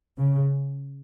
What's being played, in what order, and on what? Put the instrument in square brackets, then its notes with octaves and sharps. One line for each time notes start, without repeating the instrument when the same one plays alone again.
[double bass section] C#3